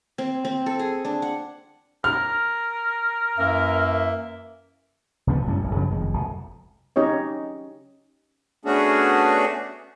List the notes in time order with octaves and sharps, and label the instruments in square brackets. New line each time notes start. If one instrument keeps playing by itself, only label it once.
[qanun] C4
C4
A4
G#4
D4
F#5
[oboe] A#4 [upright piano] F6
[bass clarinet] F#2 [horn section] E3 A#3 E5
[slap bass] D2 C#3 F3 B3
A1 F#2 G3 C#4
D1 B1 F#2
F#2 C#3 F3 F#3
F1 F2 D#3 G#3
F1 F2 B2
[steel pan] C#4 D#4 G4 C#5 D#5
[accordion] A3 B3 C#4 D4 F#4 G#4